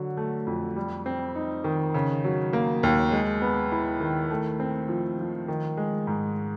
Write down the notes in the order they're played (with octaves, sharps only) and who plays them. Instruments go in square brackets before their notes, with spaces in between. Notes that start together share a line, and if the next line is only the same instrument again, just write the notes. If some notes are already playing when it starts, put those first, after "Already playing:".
Already playing: [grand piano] D3 F#3
A3
F2
G3
C4
D#4
D#3
C#3
F#3
A#3
D#2
G#3
B3
E4
D#3
A3
C4
F3
F3
D#3
G#3
G#2